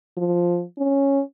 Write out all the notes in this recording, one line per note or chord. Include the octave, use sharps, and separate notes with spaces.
F3
C#4